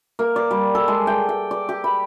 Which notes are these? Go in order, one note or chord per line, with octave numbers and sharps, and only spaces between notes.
A#3
D5
G3
A4
G#3
G5
G5
D5
G4
B5